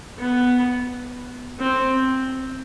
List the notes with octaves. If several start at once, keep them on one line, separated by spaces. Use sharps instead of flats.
B3
C4